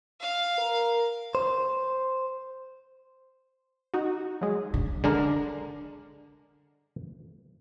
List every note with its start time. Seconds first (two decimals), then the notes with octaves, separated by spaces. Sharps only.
0.20 F5
0.58 A#4
1.35 C5
3.94 D#4 F#4
4.41 F#3 G#3
4.74 D3
5.04 D3 G#3 D4 A#4